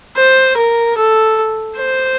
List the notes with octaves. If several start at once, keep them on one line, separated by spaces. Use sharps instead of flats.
C5
A#4
A4
C5